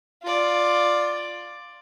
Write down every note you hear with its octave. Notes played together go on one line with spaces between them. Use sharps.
F4 D5